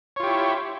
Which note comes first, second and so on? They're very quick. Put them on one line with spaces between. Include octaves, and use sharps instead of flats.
C#5 F4 G4 E4